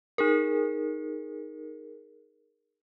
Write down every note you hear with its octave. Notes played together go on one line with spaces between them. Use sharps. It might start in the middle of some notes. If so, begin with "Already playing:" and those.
D#4 G#4 A#4